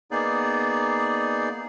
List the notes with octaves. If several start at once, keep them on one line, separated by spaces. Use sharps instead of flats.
A#3 B3 D#4 G#4 D5